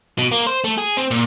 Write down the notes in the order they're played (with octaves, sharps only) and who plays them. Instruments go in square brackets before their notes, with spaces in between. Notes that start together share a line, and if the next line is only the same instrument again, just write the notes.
[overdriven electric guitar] B2
A#3
C5
A3
G#4
C4
A#2